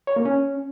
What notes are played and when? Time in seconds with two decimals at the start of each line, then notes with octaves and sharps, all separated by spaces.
0.07 C#5
0.16 A#3
0.25 C#4